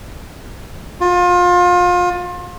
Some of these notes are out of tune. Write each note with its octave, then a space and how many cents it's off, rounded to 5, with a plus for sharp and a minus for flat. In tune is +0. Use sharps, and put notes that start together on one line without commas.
F4 +30